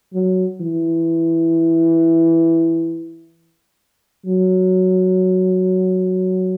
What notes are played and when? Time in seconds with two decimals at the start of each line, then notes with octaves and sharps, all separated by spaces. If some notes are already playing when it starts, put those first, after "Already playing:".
0.14 F#3
0.60 E3
4.26 F#3